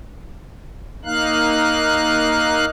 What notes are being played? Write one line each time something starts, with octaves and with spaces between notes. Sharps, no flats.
A#3 D#4 F5 F#6